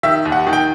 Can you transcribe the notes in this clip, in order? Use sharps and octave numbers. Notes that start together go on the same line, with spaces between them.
D#3 E5
D#2
F#5
D#3
G5